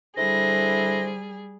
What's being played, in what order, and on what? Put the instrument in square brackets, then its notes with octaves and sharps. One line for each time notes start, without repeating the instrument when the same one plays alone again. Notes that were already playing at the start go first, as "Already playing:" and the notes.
[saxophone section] D3 E4 C5 [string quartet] G3 G#4 [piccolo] A#6